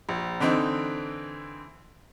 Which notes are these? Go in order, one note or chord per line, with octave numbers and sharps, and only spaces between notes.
A#1
D3 E3 C4 D#4